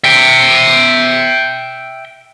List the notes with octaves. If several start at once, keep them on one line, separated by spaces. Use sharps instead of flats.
E5 G5